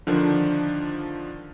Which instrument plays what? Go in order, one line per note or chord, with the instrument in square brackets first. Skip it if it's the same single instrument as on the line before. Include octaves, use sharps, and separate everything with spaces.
[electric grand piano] D3 D#3 F3 D4